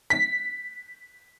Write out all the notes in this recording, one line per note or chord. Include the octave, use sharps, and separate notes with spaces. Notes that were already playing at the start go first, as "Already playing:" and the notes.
B6